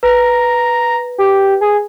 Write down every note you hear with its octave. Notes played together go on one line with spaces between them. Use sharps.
B4 A#5
G4
G#4